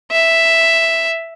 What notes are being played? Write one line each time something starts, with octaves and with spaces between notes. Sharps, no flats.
E5